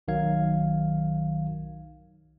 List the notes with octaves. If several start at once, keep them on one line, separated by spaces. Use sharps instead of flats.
B1 D#3 F#3 F5 G#6